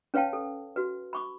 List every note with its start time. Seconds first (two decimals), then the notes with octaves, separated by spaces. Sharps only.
0.14 C#4 B4 C#5 F5 G5 A5
0.33 A4
0.76 F#4 B4
1.13 B5 C#6 D6